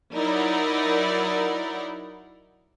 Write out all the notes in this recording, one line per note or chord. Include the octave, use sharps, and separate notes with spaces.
F#3 D#4 E4 A#4 D5 F#5